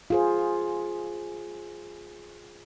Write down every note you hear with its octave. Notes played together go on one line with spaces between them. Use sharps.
F4 G#4 C5